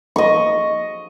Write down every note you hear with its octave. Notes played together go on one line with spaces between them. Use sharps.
D#5 C#6